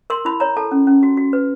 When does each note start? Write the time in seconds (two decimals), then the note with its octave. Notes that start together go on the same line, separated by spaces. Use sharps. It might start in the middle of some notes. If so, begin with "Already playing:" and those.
0.10 A#4 C6
0.25 E4 B5
0.40 C#5 A#5
0.57 A4 A5
0.71 C#4
0.87 C#4
1.03 F#4
1.17 F#4
1.33 B4